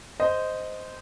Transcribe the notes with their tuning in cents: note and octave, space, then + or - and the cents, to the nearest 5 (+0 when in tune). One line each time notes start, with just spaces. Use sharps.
C5 -10 D#5 +0